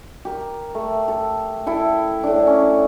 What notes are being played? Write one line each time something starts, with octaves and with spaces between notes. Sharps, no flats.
G4 A#4
A3
A4
E4 A4 G5
A2 D4
C#4 D5